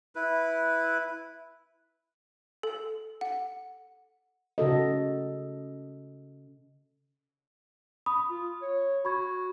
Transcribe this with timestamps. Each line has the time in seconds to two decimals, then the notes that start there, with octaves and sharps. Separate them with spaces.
0.16 E4 B4
2.63 A4
3.21 F#5
4.58 C#3 F#4 A4 D#5
8.06 B5 D#6
8.30 F4
8.62 C#5
9.05 F#4 B5 C#6 G#6